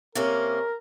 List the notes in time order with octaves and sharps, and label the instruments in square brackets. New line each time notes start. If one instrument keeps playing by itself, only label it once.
[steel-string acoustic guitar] C3 A#3 C#4 [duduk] A#4